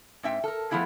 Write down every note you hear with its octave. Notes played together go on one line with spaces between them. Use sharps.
G#2 C4 E5 G5
A4 A#4
F3 A3 B3 E4 G#4